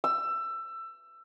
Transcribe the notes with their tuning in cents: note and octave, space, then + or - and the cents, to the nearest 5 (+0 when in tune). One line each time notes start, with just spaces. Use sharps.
E6 +20